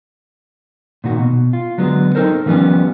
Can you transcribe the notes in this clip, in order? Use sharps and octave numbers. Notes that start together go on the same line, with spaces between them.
A#2 D#3 F#4
B2
F4
D3 F#3 G#3 B3
C4 D#4 A4 A#4 C5
D#3 F3 G3 B3 C#4